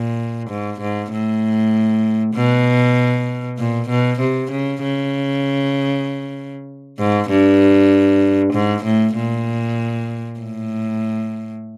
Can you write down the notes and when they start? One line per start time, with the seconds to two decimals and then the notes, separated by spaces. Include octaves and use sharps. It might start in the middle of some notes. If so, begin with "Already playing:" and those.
Already playing: A#2
0.50 G#2
0.81 G#2
1.11 A2
2.34 B2
3.59 A#2
3.89 B2
4.20 C3
4.51 C#3
4.82 C#3
6.99 G#2
7.30 G2
8.53 G#2
8.84 A2
9.16 A#2
10.40 A2